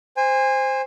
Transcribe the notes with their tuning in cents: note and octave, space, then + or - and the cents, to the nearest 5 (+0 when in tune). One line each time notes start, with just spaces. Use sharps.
C5 +0 G#5 -30